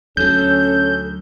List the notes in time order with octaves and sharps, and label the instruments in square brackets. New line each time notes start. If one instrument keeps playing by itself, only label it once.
[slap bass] D2 F#3 [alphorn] C#4 [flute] A4 [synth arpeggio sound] G6